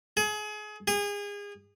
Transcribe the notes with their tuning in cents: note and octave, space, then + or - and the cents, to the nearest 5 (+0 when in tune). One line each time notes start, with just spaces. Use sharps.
G#4 +30
G#4 -30